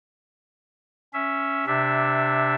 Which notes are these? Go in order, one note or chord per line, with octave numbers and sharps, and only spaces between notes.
C#4 E5
C3 D4 E5